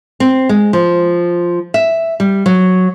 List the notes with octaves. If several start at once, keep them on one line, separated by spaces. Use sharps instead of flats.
C4
G#3
F3
E5
G3
F#3